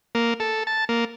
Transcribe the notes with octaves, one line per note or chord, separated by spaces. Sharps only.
A#3
A4
A5
A#3